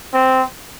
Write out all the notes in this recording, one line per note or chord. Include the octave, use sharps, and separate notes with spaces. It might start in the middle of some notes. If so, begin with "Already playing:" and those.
C4